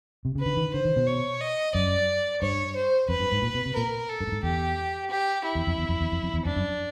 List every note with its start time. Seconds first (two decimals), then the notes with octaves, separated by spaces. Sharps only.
0.25 C3
0.35 C#3 B4
0.46 D3
0.57 D#3
0.74 D3 C5
0.85 D#3
0.96 B2
1.07 C#5
1.41 D#5
1.75 F#2 D5
2.42 G2 C#5
2.76 C5
3.09 F2 B4
3.20 G2
3.32 G#2
3.42 A#2
3.54 B2
3.66 C3
3.76 A#2 A#4
4.09 A4
4.20 G2
4.27 A2
4.32 G#2
4.43 E2 G4
5.10 G4
5.45 E4
5.55 E2
5.67 F2
5.78 E2
5.89 F2
6.01 E2
6.12 F2
6.23 F2
6.34 E2
6.45 F2 D4
6.56 F#2